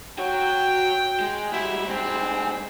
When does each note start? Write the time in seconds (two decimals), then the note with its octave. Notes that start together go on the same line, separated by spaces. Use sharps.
0.18 F#4 C#5 G5
1.20 G#3
1.52 F#3 G3 E4
1.88 G2 G#3 C4